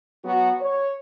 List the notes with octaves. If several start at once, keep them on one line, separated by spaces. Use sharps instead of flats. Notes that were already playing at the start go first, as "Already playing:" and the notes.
F#3 B3 F#4
C#5